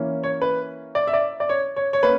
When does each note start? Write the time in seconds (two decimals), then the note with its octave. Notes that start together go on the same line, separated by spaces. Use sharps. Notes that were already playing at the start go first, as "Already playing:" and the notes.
Already playing: E3 A#3 C#4
0.24 C#5
0.42 B4
0.95 D5
1.07 E5
1.13 D5
1.40 D5
1.49 C#5
1.76 C#5
1.93 C#5
2.03 A#3 C#4 B4